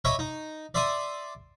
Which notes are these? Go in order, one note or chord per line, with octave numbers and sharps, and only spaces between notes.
C#5 D#5 E5 B5 C#6 D6
D#4
D5 E5 C6 D6 D#6